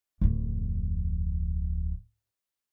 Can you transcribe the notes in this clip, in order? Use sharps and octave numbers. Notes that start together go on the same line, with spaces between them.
D1 F2